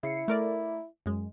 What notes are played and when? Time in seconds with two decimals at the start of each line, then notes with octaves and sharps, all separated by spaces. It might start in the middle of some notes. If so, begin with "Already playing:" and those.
0.03 C#3 E4 C7 C#7
0.28 A3 A#4 D5
1.06 F#2 G#3